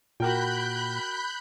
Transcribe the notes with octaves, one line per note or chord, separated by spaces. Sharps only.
A#2 F#4 A#4 G5 B5 F#6 G6